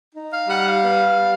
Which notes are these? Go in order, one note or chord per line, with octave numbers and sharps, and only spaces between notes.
D#4
F5
G3 F#5
F5
B3
G3